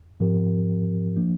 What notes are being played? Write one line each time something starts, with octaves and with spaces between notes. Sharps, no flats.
G#2 F3 C4 G4 A#4
F3 A#3 D4